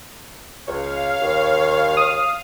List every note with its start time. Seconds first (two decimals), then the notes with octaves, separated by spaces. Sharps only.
0.68 C#2 C#5 F5
1.21 D#2
1.97 D#6